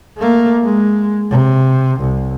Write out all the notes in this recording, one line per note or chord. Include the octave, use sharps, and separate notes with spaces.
A3 A#3
G#3
C3
C2